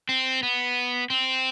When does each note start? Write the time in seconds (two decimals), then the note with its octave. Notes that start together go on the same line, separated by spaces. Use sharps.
0.09 C4
0.43 B3
1.10 C4